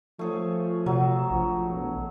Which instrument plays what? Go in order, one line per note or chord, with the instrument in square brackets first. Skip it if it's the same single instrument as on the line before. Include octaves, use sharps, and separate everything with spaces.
[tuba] F3 [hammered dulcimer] A3 G#4 C#5
[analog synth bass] C3 [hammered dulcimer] F#3
[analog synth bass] A#1 [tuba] F3
[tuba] E1